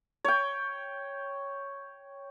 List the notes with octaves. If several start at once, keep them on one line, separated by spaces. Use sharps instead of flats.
C#5 G5